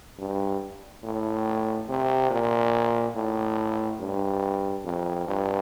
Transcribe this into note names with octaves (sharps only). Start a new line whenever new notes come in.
G2
A2
C3
A#2
A2
G2
F2
G2